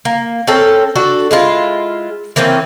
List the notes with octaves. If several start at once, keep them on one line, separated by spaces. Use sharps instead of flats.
A#3
C4 C#4 A4 A#4
D4 F#4 A4
G#3 E4 F4
E3 A#3 C4 C#4